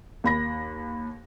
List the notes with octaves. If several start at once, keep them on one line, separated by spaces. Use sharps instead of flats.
D#2 B5 A#6